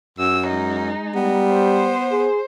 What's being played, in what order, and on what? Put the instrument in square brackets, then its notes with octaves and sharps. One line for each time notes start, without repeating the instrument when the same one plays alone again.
[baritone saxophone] F#2 [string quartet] E6
[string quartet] G#3 D#4
[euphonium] G3 [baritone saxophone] B3
[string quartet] C5
[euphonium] G#4